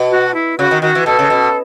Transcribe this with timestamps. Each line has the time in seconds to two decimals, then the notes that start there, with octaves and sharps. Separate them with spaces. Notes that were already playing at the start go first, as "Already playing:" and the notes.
Already playing: B2
0.11 F#4
0.34 E4
0.58 C#3 F#4
0.71 D#3
0.82 D#3 F#4
0.95 E3
1.06 B2 A4
1.19 C#3
1.30 B2